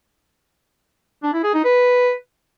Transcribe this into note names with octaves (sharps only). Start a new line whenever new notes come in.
D4
E4
G#4
D#4
B4